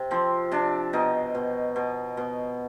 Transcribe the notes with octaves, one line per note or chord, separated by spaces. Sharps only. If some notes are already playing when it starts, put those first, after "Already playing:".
Already playing: C3
F3 C4
C3 D4
B2 D#4
B2
B2
B2